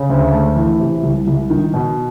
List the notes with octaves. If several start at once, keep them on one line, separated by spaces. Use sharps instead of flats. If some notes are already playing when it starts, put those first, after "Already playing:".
Already playing: C#3
D2
A3
E3
C3
C2
C2
D#3
B2